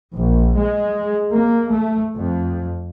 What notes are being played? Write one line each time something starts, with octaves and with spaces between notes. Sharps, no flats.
A#1
G#3
A#3
A3
F2